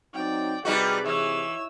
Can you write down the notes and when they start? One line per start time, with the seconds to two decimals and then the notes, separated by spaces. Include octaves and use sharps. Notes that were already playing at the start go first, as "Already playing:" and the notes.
0.14 F#3 C4 D#4 D5 G5
0.65 C3 G3 D#4 F#4 G#4 B4 D5
1.06 E3 C#5 E6